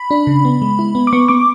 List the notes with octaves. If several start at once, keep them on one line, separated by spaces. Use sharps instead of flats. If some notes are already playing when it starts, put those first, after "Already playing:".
Already playing: B5
D4
C#3
B3
G#3
E4
B3
D6
B3 C#6
B3 D6